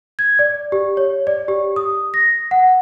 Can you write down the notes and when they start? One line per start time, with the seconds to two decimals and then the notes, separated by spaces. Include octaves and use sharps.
0.19 G#6
0.39 D5
0.72 G4
0.97 C#5
1.27 D5
1.48 G4
1.76 D#6
2.14 A#6
2.51 F#5